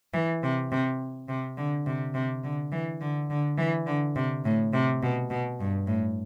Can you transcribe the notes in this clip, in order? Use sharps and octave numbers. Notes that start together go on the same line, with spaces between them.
E3
C3
C3
C3
D3
C3
C3
D3
E3
D3
D3
E3
D3
C3
A2
C3
B2
B2
G2
A2